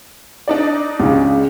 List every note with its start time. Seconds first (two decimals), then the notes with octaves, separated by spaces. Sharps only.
0.48 D4 D#4 D5
1.00 C#2 C#3